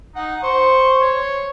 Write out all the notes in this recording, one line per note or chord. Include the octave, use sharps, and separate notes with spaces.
D#4 F#5
C5 C#6
C#5